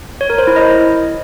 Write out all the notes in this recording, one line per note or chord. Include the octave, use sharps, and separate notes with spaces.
C#5
A#4
C5
E4
D#5